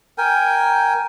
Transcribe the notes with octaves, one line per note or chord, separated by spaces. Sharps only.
A#4 G5 G#5